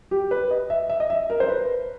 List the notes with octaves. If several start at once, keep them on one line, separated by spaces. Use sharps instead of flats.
G4
B4
D#5
E5
E5
D#5
E5
A#4
C5
B4